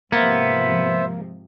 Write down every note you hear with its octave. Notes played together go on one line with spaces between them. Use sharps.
G#2 C3 F3 A#3 B3 C5 E5